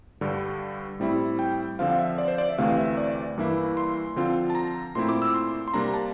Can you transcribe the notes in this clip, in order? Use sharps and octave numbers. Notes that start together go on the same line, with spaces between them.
G2 D3 G3
A2 G3 C4 E4
G5
D3 F3 C4 F4 F5
F5
E5
D5
C5
D5
E5
D2 C3 E3 A3 C4 F5
E5
D5
G2 E3 A#3 E4
C6
D3 F3 C4 F4
A5
A#5
A#2 A3 C4 E4 C6
D6
E6
C6
C6
C3 G3 A#3 D4 A#5
A#5
A5